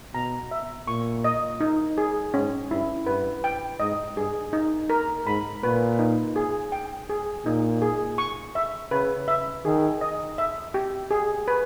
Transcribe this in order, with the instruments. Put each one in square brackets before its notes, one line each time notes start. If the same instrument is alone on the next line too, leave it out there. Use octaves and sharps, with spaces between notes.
[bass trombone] B2 [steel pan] A#5
[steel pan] E5
[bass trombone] A#2 [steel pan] C#6
[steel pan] D#5
D#4
G#4
[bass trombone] G#2 [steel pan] C#4
[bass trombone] G2 [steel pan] E4
[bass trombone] G2 [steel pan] B4
[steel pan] G5
[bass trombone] G#2 [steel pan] D#5
[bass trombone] G2 [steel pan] G#4
[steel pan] D#4
A#4
[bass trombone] G#2 [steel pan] B5
[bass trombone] A#2 [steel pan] B4
[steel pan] D#4
G#4
G5
G#4
[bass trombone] A#2 [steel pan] D#4
[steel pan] G#4
C#6
E5
[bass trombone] C#3 [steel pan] B4
[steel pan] E5
[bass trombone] D#3 [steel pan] G#4
[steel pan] D#5
E5
G4
G#4
B4